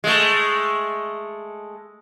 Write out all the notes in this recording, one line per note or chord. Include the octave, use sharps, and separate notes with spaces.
G#3 A3